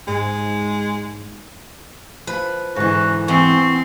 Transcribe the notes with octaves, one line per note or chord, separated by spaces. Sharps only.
G#2 G#3
F3 B4
G#2 D3 E3 F#4
E2 C4 C#6